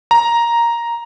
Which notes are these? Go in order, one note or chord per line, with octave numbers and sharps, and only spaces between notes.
A#5